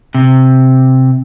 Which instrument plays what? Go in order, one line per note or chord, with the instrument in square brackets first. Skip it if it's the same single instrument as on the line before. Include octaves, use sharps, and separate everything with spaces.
[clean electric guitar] C3